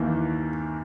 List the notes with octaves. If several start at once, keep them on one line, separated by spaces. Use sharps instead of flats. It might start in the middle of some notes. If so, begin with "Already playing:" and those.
Already playing: D#2 D#3 E3 A#3